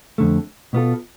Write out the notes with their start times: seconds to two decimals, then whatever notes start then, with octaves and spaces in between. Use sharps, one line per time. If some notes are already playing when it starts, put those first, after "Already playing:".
0.18 F2 D3 A3
0.73 B2 B3 F4 A4